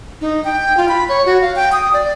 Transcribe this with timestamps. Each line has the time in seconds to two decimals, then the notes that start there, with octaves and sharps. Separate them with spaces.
0.21 D#4
0.45 G5
0.77 F4
0.89 B5
1.09 C#5
1.26 F#4
1.41 F5
1.56 G5
1.72 D#6
1.93 D5